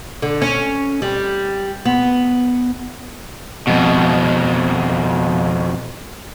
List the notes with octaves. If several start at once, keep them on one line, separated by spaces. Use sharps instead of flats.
D3
C#4
G3
B3
F2 B2